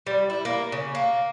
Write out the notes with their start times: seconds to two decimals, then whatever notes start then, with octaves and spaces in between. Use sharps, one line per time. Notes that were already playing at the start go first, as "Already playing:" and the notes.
0.07 G3
0.30 E4
0.45 A#3
0.72 C#3
0.95 A#3